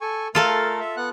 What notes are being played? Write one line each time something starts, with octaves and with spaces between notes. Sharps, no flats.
A4 G#5 C#6
A3 F4 A4 A#4 F5
E5
B3 F#5 F#6